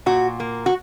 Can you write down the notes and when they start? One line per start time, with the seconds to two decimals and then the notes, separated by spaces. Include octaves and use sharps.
0.06 A#2 F#4
0.40 A#3
0.66 F#4